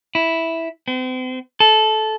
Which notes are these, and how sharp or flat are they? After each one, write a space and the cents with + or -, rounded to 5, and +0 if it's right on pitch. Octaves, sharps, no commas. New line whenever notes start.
E4 -5
C4 -40
A4 -15